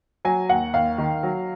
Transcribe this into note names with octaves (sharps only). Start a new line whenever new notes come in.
F#3 G#5
D#2 F#5
D#2 F5
D#3
F#3